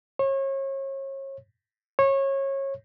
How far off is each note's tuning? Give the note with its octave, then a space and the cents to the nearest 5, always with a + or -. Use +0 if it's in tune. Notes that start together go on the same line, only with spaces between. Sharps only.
C#5 -35
C#5 -25